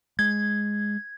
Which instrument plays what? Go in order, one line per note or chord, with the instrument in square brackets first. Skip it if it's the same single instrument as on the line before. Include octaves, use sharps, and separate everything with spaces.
[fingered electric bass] G#3 [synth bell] G#6